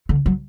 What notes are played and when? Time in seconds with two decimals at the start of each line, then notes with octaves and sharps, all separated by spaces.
0.09 D3
0.26 F#3